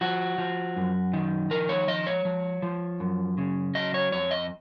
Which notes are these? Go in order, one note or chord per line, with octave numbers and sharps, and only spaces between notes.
F3 F#4
F3
F#2
D#3
F3 A#4
C#5
F3 D#5
C#5
F3
F3
F#2
C#3
F#3 D#5
C#5
F2 C#5
D#5